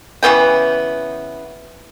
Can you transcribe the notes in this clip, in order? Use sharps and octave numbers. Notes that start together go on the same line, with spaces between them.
C#3 E3 B3 G5